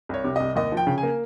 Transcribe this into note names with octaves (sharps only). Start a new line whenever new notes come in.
C2 C#5
C3
C2 D#5
D#2 D#5
F3
G5
C#3
G#5
A#3